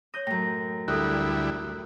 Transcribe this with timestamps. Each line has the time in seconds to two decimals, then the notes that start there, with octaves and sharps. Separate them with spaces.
0.14 C#5 D#6 G6 A#6
0.27 F#2 A2 G5 A#6
0.88 D2 G3 E4 A4 D#6 F#6